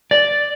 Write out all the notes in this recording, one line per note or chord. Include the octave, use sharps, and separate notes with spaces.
D5